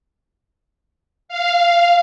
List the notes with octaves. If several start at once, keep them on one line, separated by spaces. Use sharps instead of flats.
F5